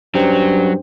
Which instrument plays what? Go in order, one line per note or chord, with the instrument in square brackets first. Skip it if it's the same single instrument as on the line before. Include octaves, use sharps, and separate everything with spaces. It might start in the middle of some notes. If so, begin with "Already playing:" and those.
[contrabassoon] G2 [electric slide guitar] F#3 [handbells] C#4 C5 G5